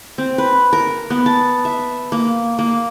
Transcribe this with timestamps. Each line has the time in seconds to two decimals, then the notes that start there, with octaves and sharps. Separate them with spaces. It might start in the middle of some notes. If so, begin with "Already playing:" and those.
0.18 C4
0.38 B4
0.73 A#4
1.10 B3
1.26 A5
1.65 E5
2.12 A#3
2.59 A#3